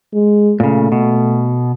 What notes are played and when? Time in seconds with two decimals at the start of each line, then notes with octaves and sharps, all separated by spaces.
0.14 G#3
0.60 A#2 C#3 A3
0.92 B2